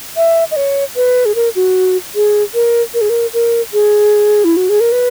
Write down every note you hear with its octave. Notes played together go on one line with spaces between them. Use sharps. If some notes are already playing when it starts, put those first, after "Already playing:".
E5
D#5
C#5
B4
G#4
A#4
F#4
G#4
A#4
A#4
G#4
A#4
A#4
G#4
E4
F#4
G#4
A#4
B4